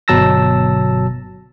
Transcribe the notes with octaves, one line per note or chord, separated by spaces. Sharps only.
G1 B2 F#3 A5 E6 A#6